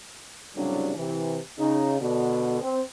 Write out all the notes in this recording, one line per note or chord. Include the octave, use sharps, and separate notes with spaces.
C2 A2 C#3 F#3 G3 D4
C3 E3
C#3 D#4
B2 D3
C4